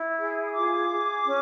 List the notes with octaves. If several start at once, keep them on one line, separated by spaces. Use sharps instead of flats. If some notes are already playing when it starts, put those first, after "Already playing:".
Already playing: E4
G#4
D#6
F4 D6
G#4
C#4